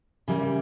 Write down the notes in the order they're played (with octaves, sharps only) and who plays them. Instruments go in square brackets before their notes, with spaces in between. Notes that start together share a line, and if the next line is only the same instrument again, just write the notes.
[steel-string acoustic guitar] C#3 E3 G3 A#3